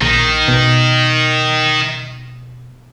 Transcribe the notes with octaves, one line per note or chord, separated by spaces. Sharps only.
A#1 D#3
B2